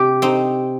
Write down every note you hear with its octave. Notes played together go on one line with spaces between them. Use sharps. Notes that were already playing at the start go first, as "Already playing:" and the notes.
Already playing: C3 G4
C4 D#4